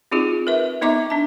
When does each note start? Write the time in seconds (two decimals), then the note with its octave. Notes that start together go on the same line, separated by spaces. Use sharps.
0.12 C4 D#4 F4 F#4 G#4
0.47 A#4 B4 E5
0.81 B3 D#4 D#5 E5 A#5 D6
1.10 D4 A5